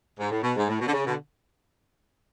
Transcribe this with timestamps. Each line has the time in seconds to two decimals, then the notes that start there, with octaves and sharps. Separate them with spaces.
0.19 G#2
0.31 A2
0.43 B2
0.56 G#2
0.69 A2
0.80 B2
0.87 D3
0.94 C#3
1.06 B2 D3